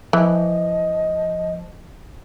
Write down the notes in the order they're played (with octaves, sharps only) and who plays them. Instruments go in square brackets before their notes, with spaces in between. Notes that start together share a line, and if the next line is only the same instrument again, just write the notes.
[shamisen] E3 [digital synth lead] F3 [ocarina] D#5